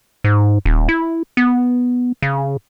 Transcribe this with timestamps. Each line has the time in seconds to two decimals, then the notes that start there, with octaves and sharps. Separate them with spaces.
0.24 G#2
0.65 D#1
0.89 E4
1.37 B3
2.22 C#3